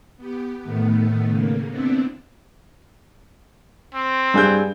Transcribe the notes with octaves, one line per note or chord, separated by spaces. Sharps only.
B3 G4
A2 D#3 A3 B3
C#3 A#3
B3 C4 D4 E4
C4
G2 G#4 G6